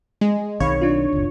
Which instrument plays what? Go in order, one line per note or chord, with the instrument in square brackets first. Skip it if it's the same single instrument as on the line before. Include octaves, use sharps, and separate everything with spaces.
[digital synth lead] G#3
[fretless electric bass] B1 D#3 C4 [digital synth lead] C#5 [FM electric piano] F5 B5 C#6
[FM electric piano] D4 F4
[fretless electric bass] F#1 C#2